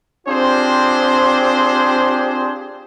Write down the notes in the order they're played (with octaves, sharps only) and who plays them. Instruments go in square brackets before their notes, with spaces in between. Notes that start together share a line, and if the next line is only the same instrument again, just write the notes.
[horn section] C4 D4 F4 G4 G#4 C5